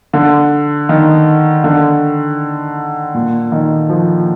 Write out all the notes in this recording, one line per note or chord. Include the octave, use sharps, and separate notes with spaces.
D3
D#3
D3
A#2
D#3
F3